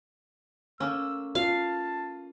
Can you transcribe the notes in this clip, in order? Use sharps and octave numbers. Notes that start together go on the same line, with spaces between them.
A3 A#3 C#4 E6
F4 F5 A5